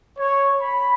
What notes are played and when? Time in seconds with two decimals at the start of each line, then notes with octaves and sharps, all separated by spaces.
0.18 C#5
0.61 B5